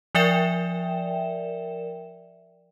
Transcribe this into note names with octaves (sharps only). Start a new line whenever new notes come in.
F3 A#4 D5 E5 G5 E7